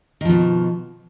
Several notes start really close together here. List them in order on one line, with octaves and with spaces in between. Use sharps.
D#3 F3 B2